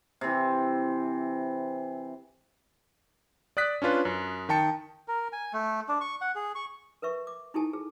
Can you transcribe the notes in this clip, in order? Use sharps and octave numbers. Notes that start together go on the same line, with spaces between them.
C3 E3
D5 D#6 F#6 B6
C#4 D4 F4 B4
F#2
D#3 G5 A5 C#7
A#4
G#5
A3
D4
C#6
F#5
G#4
C#6
A#4 B4 E5 C#6
D6
D#4 E4 G4 A4 G#5 A5
G#4